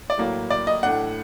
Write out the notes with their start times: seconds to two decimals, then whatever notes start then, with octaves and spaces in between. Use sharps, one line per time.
0.10 D5
0.18 A2 F#3 A#3
0.50 D5
0.67 D#5
0.83 A2 A3 D4 F#5